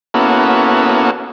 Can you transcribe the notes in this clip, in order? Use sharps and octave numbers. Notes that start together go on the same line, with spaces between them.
A#3 B3 C#4 E4 F#4 A4